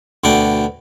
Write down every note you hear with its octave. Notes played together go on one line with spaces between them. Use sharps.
D2 B2 D4 G5